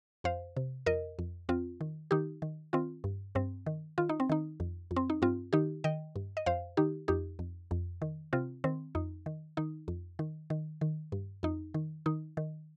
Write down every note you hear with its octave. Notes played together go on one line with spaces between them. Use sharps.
F2 C5 F5
C3
F2 A#4 D#5
F2
F2 C4 F4
D#3
D#3 D#4 G4
D#3
D#3 C4 F4
G2
G2 C4
D#3
D#3 F4
D#4
C4
D#3 D#4
F2
F2
C4
D#4
G2 C4 F4
D#3 D#4 G4
D#3 D#5 G5
G2
D#5
F2 C5 F5
D#3 D#4 G4
F2 D#4 G4
F2
F2
D#3
C3 C4 F4
D#3 C4
F2 D#4
D#3
D#3 D#4
F2
D#3
D#3
D#3
G2
F2 D#4
D#3
D#3 D#4
D#3